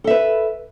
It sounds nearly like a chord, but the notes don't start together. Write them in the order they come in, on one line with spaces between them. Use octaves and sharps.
A4 E5 B4